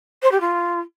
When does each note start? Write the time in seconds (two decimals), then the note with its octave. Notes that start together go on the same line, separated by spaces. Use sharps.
0.22 C5
0.32 G4
0.41 F4